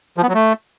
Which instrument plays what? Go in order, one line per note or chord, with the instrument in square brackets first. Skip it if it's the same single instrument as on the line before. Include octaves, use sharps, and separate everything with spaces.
[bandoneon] F3
B3
F#3
A3